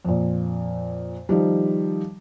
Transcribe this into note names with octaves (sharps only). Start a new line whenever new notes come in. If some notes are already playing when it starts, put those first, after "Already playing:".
F2 A#2
D#3 F3 G3